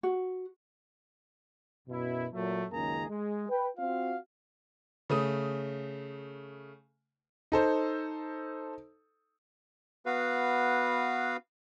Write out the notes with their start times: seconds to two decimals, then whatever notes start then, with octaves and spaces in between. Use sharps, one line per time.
0.03 F#4
1.88 F#2 B2 E4
2.32 A#2 F#3 A3
2.70 C#2 F#2 D#3 A#3 G#4 A#5
3.09 G#3
3.49 B4 G5
3.78 C4 F4 F#4 F5
5.10 C#3 A3 D#6
7.52 D#4 A4 C5
10.06 B3 F#4 B4 F5